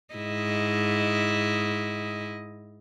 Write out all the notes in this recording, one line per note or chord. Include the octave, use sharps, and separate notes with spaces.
G#2 E4 D#5